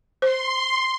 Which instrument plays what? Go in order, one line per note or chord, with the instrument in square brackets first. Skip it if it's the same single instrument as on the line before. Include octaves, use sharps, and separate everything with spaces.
[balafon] C5 [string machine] C6